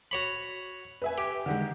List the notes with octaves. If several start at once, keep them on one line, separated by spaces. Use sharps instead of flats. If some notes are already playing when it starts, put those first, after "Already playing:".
F#4 C#5 B5
B4 E5 G#5
G4
D3 D#3 G#3